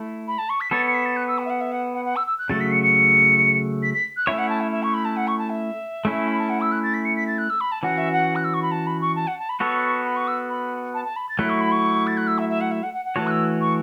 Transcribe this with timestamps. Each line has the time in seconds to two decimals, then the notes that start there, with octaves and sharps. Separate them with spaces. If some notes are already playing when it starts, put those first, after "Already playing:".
Already playing: A3 E4
0.28 B5
0.38 A5
0.49 C#6
0.61 B6
0.71 B3 A4 C#5 A6
0.88 C#7
0.94 B6
1.06 A6
1.16 F#6
1.28 E6
1.38 F#5
1.46 E5
1.50 F#5
1.61 E5
1.72 F#5
1.94 F#5
2.05 F#5
2.16 E6
2.27 E6
2.38 F#6
2.50 C#3 F#3 A3 A6
2.61 B6
2.72 C#7
2.83 C#7
3.83 B6
3.94 B6
4.16 F#6
4.27 A3 C#4 E4 C#5 E5
4.38 F#5
4.49 A5
4.61 E5
4.72 E5
4.83 C#6
4.94 B5
5.05 A5
5.16 F#5
5.27 C#6
5.38 A5
5.50 E5
6.05 A3 C#4 E4
6.28 B5
6.39 A5
6.49 F#5
6.61 E6
6.72 F#6
6.83 A6
6.94 B6
7.05 C#7
7.16 B6
7.28 A6
7.38 F#6
7.50 E6
7.61 B5
7.72 A5
7.83 E3 C#4 F#4 F#5
7.98 E5
8.13 F#5
8.36 F#6
8.44 E6
8.54 C#6
8.62 B5
8.71 A5
8.87 B5
9.01 C#6
9.16 A5
9.27 F#5
9.39 A5
9.49 B5
9.60 B3 F#4 A4 C#5 C#6
10.05 B5
10.16 C#6
10.27 E6
10.50 B5
10.94 A5
11.05 A5
11.16 B5
11.29 A6
11.38 F#3 A3 E4 F#6
11.49 C#6
11.61 B5
11.72 C#6
12.07 A6
12.17 F#6
12.27 E6
12.38 E5
12.49 E5
12.61 F#5
12.71 E5
12.83 F#5
12.94 F#5
13.05 F#5
13.16 E3 A3 F#4 C#5 A5
13.27 F#6
13.31 E6
13.61 C#6